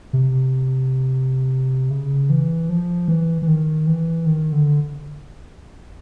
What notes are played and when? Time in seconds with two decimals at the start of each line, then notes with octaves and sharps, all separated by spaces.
0.13 C3
1.90 C#3
2.30 E3
2.69 F3
3.08 E3
3.42 E3
3.48 D#3
3.87 E3
4.26 D#3
4.52 D3